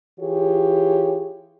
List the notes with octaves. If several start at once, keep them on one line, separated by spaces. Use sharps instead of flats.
E3 F4 G4 G#4 C#5